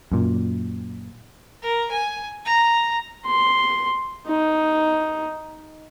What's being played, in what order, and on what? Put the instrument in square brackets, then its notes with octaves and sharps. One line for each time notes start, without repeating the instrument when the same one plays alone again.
[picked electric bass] F#2 A#2
[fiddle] A#4
G#5
A#5
[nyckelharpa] C6
D#4